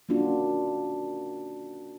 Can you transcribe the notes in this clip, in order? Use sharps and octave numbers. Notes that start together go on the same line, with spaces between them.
A#3 C#4 D4 F4 F#4